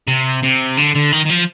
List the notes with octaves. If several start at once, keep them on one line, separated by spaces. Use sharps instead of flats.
C3
C3
D3
D3
D#3
D#3
F3